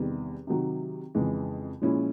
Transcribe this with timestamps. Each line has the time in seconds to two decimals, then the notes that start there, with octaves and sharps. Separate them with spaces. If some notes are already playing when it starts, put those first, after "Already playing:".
Already playing: E2 C3 D#3 G3
0.47 C3 D#3 F#3
1.15 F2 C#3 E3 G#3
1.82 A#2 F3 G#3 C#4 E4